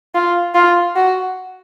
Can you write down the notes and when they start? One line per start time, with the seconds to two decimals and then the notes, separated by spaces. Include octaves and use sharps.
0.15 F4
0.55 F4
0.96 F#4